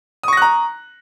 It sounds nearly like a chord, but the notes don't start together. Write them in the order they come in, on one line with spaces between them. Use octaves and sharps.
D#6 C#6 A#6 F#6 A#5